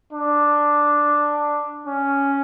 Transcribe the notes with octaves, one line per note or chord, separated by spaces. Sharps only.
D4
C#4